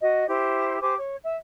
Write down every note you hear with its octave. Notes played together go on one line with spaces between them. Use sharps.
F#4 D#5
E4 G4 C5
G4 C5 G#5 D6
C#5
E5